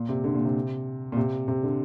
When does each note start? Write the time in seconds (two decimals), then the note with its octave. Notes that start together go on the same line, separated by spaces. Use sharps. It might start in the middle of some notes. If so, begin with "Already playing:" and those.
Already playing: A#2
0.09 C3
0.24 D3
0.35 A#2
0.45 C3
1.12 A#2
1.17 C3
1.48 C3
1.63 D3